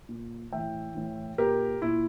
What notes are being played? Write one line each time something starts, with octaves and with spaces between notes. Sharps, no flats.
A#2
A2 E3 E5 G5
A2 E3
A#2 G4 A#4
A#2 E4